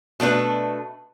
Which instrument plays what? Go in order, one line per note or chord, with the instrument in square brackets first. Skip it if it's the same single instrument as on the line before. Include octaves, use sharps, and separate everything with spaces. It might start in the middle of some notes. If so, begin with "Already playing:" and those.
[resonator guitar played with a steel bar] B2 A3 D4 B4